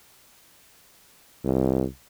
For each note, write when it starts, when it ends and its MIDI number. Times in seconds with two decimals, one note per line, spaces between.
1.45 1.84 36